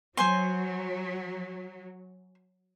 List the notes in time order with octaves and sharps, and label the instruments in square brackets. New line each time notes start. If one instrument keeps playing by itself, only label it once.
[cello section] F#3 [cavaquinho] C5 G#5 C6